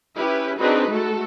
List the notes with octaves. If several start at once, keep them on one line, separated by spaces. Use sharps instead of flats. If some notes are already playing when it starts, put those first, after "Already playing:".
C#4 E4 G4 B4
C4 D4 D#4 F#4 G#4 B4
G#3 A3 F#4 A4